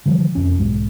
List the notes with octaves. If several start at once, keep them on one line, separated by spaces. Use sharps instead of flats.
D3 E3 F3 G3
E1 F2 C#4
B1 G#2 G#3